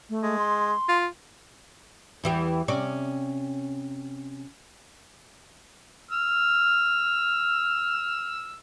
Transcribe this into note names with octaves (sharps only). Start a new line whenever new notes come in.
A3
G#3
C6
F4
E2 E3 G4
C3 C#4 D5
E6 F6